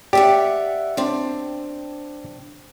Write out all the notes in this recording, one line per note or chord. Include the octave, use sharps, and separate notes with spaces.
G4 D5 E5 F#5
C4 D4